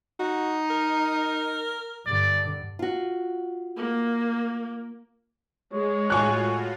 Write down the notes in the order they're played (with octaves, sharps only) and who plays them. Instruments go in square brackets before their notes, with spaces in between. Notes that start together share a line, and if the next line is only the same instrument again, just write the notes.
[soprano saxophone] D#4 [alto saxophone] F#4
[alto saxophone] A#4
[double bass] G2 D3 [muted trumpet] D5
[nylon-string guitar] F4 F#4
[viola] A#3
[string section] G#3 [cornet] C#5
[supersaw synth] A2 F4 F#4 [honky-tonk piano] G#5 C#6 F#6